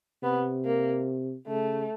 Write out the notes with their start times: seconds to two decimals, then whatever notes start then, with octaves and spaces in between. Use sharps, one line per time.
0.23 C3 B3
0.65 A#3
1.47 C#3 A3